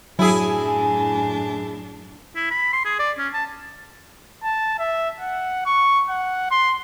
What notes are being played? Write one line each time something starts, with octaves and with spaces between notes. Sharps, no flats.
F#2 A2 F#3 D4 E4 G#4 G#5
E4
B5
C6
G#4
D5
C#4
A5
A5
E5
F#5
C#6
F#5
C6